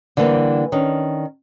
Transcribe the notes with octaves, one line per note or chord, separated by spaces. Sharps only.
D3 E3 G3 A#3 C4 E4
D#3 C#4 D4